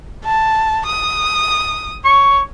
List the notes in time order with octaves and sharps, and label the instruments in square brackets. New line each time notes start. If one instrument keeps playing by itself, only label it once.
[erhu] A5
D#6
[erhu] C#5 [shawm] C#6